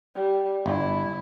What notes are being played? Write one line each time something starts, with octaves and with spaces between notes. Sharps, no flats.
G3
G1 E4